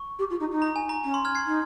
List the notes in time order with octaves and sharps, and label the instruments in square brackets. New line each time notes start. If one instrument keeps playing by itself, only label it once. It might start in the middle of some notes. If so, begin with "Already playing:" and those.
Already playing: [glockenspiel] C#6
[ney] G4
F4
D#4
D#4
[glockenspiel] A#5
G#5
A#5
[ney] C#4 [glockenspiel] A#5
[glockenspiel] C6
F6 G#6
G#6 C7
[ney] D#4